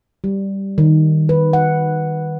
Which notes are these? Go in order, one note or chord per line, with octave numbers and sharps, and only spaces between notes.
G3
D#3
B4
F#5